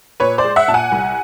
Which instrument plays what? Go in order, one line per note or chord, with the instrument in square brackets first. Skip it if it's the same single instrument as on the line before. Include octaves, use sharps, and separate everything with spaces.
[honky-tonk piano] A#2 B4 C#5
C5 D5
G#3
E5 F#5
A#2 A5
F#5 G#5
C2